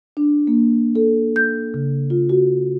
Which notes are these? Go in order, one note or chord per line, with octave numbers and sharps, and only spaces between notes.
D4
A#3
A4
G6
C#3
F4
F#4